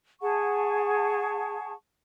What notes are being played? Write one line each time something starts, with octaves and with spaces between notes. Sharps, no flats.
G#4 F#5 A5 C#6